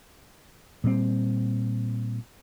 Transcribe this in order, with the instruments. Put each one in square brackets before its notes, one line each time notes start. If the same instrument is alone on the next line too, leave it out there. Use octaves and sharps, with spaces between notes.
[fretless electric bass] A#2 G3 C4